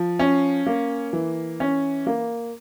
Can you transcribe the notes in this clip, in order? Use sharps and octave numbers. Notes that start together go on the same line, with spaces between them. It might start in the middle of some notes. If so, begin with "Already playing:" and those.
Already playing: F3
C#4
A#3
E3
C#4
A#3